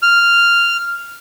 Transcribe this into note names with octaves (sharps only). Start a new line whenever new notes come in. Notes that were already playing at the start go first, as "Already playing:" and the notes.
F6